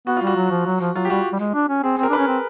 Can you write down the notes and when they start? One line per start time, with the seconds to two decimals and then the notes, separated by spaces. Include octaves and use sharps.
0.07 B3 F#4
0.17 F4
0.22 G3 F#4
0.36 F#3
0.51 F3
0.66 F#3
0.80 F3
0.96 F#3 F4
1.05 G4
1.10 G3 F#4
1.33 G3
1.40 G#3
1.54 D4
1.69 C#4
1.83 C4 G#4
1.99 C4 A#4
2.10 D4 B4
2.18 C#4
2.28 C4